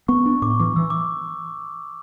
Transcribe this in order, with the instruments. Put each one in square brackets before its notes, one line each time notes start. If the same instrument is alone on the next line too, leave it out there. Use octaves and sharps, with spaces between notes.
[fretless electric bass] B3 [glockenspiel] C#6
[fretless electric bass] D4
[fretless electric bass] A2 [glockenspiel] D6
[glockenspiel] C#6
[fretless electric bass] E3 [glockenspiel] D6
[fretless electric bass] E3 [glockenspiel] E6
[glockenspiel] D6